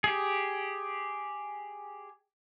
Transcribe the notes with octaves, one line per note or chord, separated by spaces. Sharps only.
G4 G#4